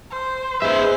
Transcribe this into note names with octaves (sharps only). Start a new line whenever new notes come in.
C5
A#3 B3 D#4 G#4 B4 C5 E5